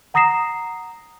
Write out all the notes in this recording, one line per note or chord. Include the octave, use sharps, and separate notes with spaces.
F#5 A#5 D#6 A#6 C7 E7